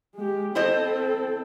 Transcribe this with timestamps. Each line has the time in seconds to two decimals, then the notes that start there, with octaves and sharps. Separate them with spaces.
0.16 G#3 G4
0.55 C4 E4 A4 C5 D#5